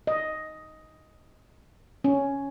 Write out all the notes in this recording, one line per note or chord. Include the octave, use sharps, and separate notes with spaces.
D#5
C#4